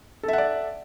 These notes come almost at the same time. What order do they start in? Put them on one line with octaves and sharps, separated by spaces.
A4 E5 F#5 D5